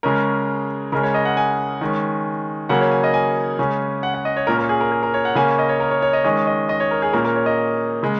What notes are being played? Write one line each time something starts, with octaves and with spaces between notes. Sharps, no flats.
C#3 G#3 C#4 A#4
C#3 G#3 C#4 A#4
C#5
D#5
F#5
G#5
D#3 G#3 C#4
C#3 F#3 A#3 C#4 F#5
C#5
G#5
D#5
G#5
C#3 G#3 C#4
F#5
F#5
D#5
C#5
A#2 A#3 C#4 A#4
A#4
G#4
A#4
G#4
A#4
C#5
F#5
C#3 A#3 C#4 G#5
D#5
C#5
A#4
C#5
C#5
D#5
D#3 G#3 C#4 D#5
D#5
D#5
C#5
A#4
G#4
A#2 A#3 C#4 A#4
A#4
C#5
D#5
C#3 G#3